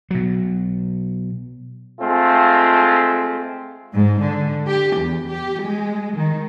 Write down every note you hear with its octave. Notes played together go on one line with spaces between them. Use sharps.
B2 F#3
G#3 A3 C4 F4
G#2
D3
G4
E2
G4
G#3
D#3